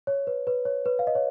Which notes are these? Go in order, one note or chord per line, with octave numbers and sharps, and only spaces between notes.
C#5
B4
B4
C#5
B4
F5
D#5
C#5